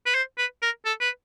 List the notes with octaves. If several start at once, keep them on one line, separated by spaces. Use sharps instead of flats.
B4
C5
B4
A#4
A4
B4